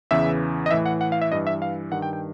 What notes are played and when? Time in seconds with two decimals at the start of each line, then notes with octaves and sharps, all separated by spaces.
0.11 E2 C#3 E3 E5
0.66 D#5
0.71 A2 E3 E5
0.86 F#5
1.01 F#5
1.12 F5
1.22 E5
1.32 G2 E3 D#5
1.47 E5
1.62 F5
1.92 G2 D#3 F#5
2.02 G5
2.13 G5